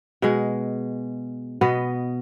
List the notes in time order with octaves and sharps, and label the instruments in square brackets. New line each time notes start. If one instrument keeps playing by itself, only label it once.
[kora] B2 G#3
B2 B3 D#5